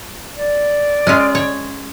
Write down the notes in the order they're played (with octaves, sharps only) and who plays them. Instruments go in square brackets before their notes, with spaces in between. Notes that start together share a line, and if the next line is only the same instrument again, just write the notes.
[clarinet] D5
[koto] G#3 C#4 F4
C#5